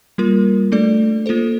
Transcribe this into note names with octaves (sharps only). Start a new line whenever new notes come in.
G3 A#3 F4 A#4
A3 D4 A4 D5
A#3 F4 A4 C5